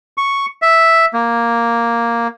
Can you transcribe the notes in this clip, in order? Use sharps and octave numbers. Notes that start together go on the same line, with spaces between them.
C#6
E5
A#3